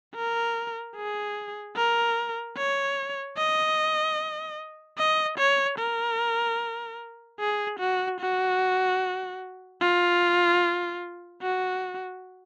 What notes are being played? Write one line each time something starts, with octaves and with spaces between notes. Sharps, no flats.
A#4
G#4
A#4
C#5
D#5
D#5
C#5
A#4
G#4
F#4
F#4
F4
F#4